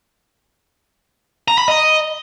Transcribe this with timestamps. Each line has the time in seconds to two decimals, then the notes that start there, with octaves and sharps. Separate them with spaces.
1.48 A#5
1.58 B5
1.68 D#5